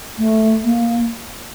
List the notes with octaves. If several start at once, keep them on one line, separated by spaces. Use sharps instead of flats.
A3
A#3